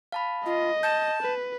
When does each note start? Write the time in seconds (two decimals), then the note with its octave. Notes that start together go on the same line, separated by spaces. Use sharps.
0.12 F5 A5 B5
0.46 F4 D#5
0.83 A5 G6
1.22 B4